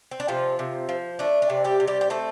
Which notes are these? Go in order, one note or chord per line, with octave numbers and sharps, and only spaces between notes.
C4
D4
C3 F3 F4
C3
F3
A3 D4
D4
C3
G3 G4
C3
G3 G4
G4
A3 C4 A4